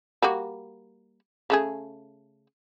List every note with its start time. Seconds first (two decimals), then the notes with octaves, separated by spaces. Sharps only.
0.22 G3 A#3 F#4
1.50 C#3 A3 G#4